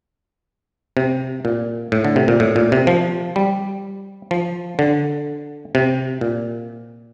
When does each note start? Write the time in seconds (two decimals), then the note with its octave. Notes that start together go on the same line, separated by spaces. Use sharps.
0.97 C3
1.45 A#2
1.92 A2
2.05 D3
2.16 C3
2.28 A#2
2.40 A2
2.56 A#2
2.72 C3
2.87 F3
3.36 G3
4.31 F3
4.79 D3
5.75 C3
6.21 A#2